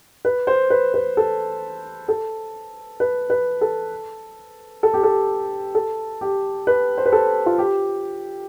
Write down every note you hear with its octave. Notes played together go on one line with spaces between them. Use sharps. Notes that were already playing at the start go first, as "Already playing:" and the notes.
B4
C5
B4
B4
A4
A4
B4
B4
A4
A4
G4
A4
A4
G4
B4
C5
B4
A4
F4
G4